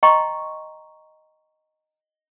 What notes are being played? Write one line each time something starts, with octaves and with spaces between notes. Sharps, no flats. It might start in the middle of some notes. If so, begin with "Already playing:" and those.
D#5 G5 A#5 C6 C#6